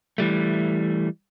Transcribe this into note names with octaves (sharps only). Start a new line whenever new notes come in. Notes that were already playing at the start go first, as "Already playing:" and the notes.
E3 G3 A3